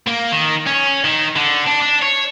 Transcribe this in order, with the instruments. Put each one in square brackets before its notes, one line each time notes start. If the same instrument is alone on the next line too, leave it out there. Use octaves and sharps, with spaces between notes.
[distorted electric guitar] A#3
D#3
C#4
D#3
D3
D4
D4
C#5